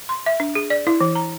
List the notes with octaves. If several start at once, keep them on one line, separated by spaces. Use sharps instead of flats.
C6
E5
D4
G#4
D5
E4
E3
A#5